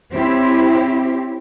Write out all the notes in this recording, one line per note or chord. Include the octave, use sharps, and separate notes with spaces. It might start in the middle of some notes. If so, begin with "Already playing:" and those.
C4 C#4 E4 G4 C5